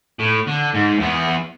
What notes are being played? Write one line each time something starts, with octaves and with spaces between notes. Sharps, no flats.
A2
D3
G#2
E2 B3